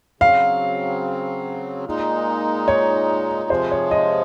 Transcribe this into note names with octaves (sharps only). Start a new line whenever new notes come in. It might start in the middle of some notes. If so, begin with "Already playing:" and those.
C#3 F#3 C4 F5
A#2 G#3 D#4
C#5
C3 F3 G#3 C5
C#5
D#5